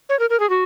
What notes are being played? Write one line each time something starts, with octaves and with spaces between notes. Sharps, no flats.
C#5
A#4
A#4
G#4
F#4